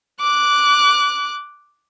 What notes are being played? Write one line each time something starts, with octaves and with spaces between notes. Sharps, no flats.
D6 F#6